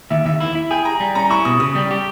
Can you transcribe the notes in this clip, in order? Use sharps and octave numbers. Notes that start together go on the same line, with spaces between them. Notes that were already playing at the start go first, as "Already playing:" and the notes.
D#2 E5
D#2 E5
E4
E4
G#4 G5
G#4 A#5
G3
C#4 A#5
E4 C#6
B2 D#6
C#3 D#6
G3
G4